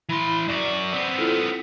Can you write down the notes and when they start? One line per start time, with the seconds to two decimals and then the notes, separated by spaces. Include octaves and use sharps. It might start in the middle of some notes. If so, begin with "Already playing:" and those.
0.09 E3 E4 B5 C6
0.48 F#2 F#4 D5 D6
0.92 B3 C4
1.18 E4 F4 A4